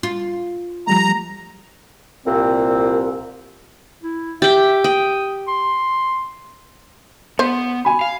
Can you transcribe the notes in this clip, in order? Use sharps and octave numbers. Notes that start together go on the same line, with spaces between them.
F4
F3 G3 A3 A#5
C2 A#2 C4
E4
G4 E5 G5
G5 D#6
C6
B3 C5
G#5 B5
F5